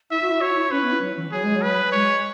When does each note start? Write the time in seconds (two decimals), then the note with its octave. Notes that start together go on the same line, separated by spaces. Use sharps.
0.10 E4 E5
0.21 F#4
0.30 E4
0.41 F#4 C#5
0.56 E4
0.71 C#4 B4
0.82 B3
0.91 E4
1.01 F#3
1.17 E3
1.32 F#3 G#4
1.43 G#3
1.55 F#3
1.62 B4
1.92 G#3 C#5